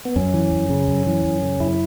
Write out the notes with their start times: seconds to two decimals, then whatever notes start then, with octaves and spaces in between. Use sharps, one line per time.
0.05 B3
0.16 F#2 C#4
0.34 E3
0.52 F#2
0.70 C#3
0.88 F#2
1.07 E3
1.25 F#2
1.42 C#3
1.60 F#2 E4